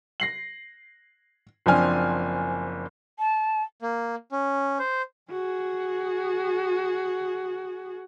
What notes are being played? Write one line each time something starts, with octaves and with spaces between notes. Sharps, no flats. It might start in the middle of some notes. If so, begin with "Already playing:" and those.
A#6 C7 F#7
F#1 F3 C4 D4 G#5 F6
A5
A#3
C#4
C5
F#4 G#4